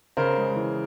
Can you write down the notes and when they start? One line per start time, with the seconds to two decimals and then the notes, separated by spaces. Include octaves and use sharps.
0.17 C#3 A#4 C5
0.37 G#3
0.56 E3